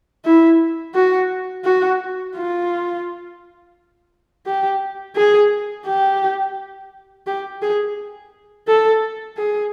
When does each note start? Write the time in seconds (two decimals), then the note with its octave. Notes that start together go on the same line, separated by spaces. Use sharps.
0.25 E4
0.95 F#4
1.64 F#4
2.35 F4
4.46 G4
5.16 G#4
5.86 G4
7.26 G4
7.62 G#4
8.67 A4
9.37 G#4